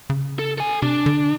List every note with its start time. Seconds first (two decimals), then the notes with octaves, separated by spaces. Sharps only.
0.10 C#3
0.39 A4
0.58 A4 G#5
0.82 C3 D4
1.06 D3